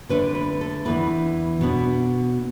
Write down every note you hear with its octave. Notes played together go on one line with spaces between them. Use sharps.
D3 A3 D4 B4
B4
A4
E2 E3 D4 B4
B2 B3 D4